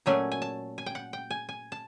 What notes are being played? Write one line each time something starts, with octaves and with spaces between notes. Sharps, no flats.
A#2 F#3 A3 C#4 G#5
G#5
A5
G#5
G5
F#5
G5
G#5
G#5
A5